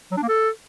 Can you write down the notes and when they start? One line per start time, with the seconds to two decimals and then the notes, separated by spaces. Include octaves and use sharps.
0.11 F#3
0.17 D4
0.23 A#3
0.28 A4